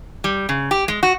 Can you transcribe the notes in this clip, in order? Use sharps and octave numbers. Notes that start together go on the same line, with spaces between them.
G3
C#3
G4
G#3
F#4